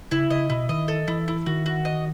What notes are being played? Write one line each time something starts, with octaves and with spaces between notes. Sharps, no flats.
C#3 E4
C#3 D#5
B2 E4
D#3 D#5
A4
E3 E4
E4
D#3 F#4
F#4
D#5